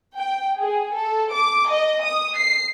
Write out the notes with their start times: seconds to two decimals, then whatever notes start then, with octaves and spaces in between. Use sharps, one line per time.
0.17 G5
0.58 G#4
0.96 A4
1.33 D6
1.71 D#5
2.03 D#6
2.38 C7